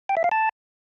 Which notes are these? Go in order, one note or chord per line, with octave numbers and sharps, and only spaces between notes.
G5
E5
F5
A5